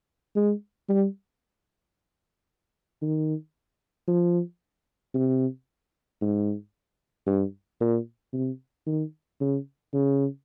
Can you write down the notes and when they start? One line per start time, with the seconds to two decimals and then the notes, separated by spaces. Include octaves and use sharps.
0.36 G#3
0.89 G3
3.02 D#3
4.08 F3
5.14 C3
6.22 G#2
7.27 G2
7.81 A#2
8.33 C3
8.87 D#3
9.41 C#3
9.94 C#3